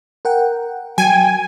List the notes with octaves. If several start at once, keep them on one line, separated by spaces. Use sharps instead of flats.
A#4 F#5 G5
F#3 G5 G#5